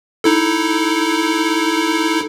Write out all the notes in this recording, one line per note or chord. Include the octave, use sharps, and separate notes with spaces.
D#4 E4 A4